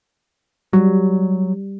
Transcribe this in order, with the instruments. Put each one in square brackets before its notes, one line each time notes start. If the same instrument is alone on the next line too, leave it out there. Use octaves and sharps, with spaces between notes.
[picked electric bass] F#3 [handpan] G3